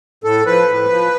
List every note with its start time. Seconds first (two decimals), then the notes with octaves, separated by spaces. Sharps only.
0.24 A2 A4
0.46 F3 B4
0.68 A2
0.90 F3